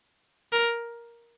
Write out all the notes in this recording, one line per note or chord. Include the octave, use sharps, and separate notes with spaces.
A#4